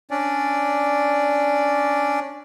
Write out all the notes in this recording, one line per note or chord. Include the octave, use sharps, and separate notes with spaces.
C#4 D4 D5